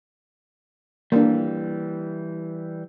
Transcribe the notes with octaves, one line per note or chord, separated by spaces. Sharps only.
E3 G3 A#3 D4